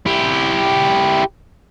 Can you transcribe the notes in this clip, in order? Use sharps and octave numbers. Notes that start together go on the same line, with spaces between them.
E4 G4